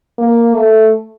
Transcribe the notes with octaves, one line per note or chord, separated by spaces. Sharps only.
A#3
A3